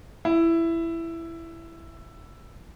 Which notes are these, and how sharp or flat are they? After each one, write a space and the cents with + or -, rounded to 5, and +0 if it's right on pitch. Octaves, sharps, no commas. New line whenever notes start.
E4 +10